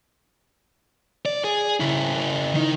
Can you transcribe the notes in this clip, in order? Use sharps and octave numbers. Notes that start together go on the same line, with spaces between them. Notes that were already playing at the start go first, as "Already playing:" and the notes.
D5
G#4
C#3 E4
D#3 D#4